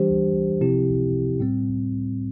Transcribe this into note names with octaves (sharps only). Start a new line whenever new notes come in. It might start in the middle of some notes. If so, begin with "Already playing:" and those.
Already playing: E3 G3 D4 G4 C5
C3 F3 C4 E4 G4
A2 G3 C4